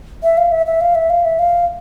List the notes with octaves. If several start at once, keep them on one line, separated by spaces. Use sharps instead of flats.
E5
F5
E5
E5
F5
E5
F5
E5
F5